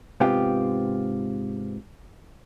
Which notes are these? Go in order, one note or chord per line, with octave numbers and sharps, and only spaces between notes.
G#2 C3 B3 C4 F4 G4